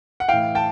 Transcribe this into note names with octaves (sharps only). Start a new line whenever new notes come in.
F#5
A2 E3 F5 G5
G5 A5